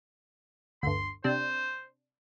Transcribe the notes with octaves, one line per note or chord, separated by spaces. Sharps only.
G1 D2 C6
C3 D4 C5